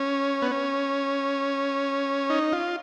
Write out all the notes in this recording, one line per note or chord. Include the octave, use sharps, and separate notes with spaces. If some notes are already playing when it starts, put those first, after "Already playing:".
Already playing: C#4
B3
C#4
D#4
F4